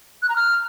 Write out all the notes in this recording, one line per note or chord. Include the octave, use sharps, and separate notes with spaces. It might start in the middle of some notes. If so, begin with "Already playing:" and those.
F#6
A#5
F6